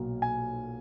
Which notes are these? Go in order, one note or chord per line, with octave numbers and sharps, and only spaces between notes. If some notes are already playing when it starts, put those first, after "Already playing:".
Already playing: B1 A#2 F#3 A#3
G#5